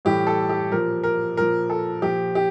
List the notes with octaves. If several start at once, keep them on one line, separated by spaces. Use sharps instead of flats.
A2 E3 G3 G4
A4
G4
A#2 F3 A#4
A#4
A#2 F3 A#4
A4
A#2 F3 G4
G4